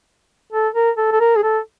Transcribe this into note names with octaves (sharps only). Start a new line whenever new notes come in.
A4
A#4
A4
A4
A#4
G#4
A4